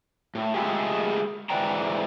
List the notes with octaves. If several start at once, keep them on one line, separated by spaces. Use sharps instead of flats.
A2
G#3 A3 F4 G4 G#4
G#2 E3 B4 D5 G5 A#5